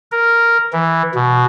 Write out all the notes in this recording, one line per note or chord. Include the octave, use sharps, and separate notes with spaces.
A#4
E3
B2